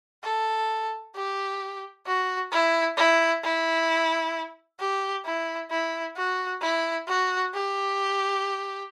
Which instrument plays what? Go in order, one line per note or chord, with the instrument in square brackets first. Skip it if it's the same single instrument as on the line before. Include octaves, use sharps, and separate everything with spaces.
[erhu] A4
G4
F#4
E4
E4
E4
G4
E4
E4
F#4
E4
F#4
G4